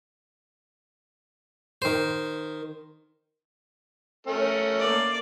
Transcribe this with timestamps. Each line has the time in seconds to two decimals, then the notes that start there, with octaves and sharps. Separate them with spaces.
1.82 D#3 C5
4.27 A3 C#4 A#4
4.80 A#3 D5